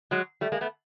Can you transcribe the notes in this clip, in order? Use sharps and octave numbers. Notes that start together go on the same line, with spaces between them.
F#3 G#3
G3 A3
G#3 A#3
A3 B3